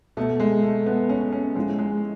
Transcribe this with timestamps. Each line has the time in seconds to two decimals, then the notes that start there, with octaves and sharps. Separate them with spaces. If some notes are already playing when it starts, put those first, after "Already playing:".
0.17 B2 A3
0.40 G#3
0.63 A3
0.86 B3
1.09 C#4
1.32 C#4
1.55 A2 F3 G#3
1.78 G#3